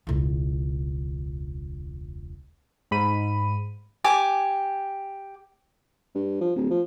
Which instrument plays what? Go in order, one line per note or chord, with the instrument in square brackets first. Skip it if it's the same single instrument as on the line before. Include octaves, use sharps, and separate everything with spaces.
[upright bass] E1 C#2
[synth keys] G#2 B5 D#7
[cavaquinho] G4 G#5 D6
[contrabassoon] G2
F3
D1
F3